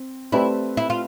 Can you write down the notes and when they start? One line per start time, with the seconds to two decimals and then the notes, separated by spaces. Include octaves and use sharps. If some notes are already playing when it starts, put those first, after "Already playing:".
Already playing: C4
0.32 A3 C4 E4 G4 B4 D5
0.77 E4
0.90 F4